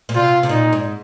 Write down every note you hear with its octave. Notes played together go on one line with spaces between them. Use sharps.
A#2
C3 F4
C3
A#2 D#4
G#2